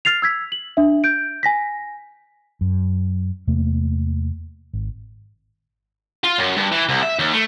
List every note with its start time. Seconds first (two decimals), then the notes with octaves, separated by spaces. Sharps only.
0.05 F6 A6 C7 F7
0.22 E6 G#6 B6
0.52 F#7
0.77 D4 E5
1.04 G6 D7
1.43 G#5 A#6 B6
2.61 F#2
3.47 E2 C3 A3 A#3
4.73 G#1
6.24 F4
6.38 F#2
6.57 G2
6.72 E3
6.89 C2
7.03 E5
7.19 D#2
7.33 A3